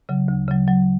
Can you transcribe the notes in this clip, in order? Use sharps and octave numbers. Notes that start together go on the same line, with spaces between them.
C#3 F#3
D2
C#3 F#3
F#3